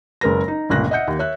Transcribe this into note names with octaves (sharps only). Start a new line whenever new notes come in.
F#1 G#3 A#4 B4 A#6
D#4
G1 C#2 A#2 F#6 A#6
D#5 E5 F#5 G6 C#7
D#2
C#5 E5 F#6